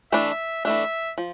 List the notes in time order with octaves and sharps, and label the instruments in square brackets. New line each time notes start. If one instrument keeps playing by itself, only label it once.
[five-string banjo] E3 A3 D4 [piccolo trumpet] E5
[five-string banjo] E3 A3 D4 [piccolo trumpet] E5
[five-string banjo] F3